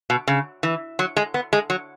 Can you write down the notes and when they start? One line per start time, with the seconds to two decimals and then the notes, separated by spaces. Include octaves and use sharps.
0.10 B2
0.28 C#3
0.63 E3
0.99 F#3
1.17 G#3
1.34 B3
1.53 G#3
1.70 F#3